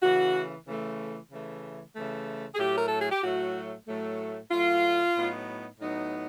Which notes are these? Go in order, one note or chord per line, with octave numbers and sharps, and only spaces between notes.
C#3 E3 A3 F#4
C#3 E3 A3
C#3 E3 A3
C#3 E3 A3
G#4
A2 F#3 A3 G4
A#4
A4
G#4
G4
A2 F#3 A3 F#4
A2 F#3 A3
A2 F#3 A3 F4
A2 F#3 B3 D#4
A2 F#3 B3 D#4